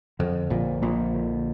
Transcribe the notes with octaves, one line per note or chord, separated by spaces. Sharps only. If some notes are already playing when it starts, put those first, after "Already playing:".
F2 D3
A#1 A#2 F3
A#1 A#2 A#3
D3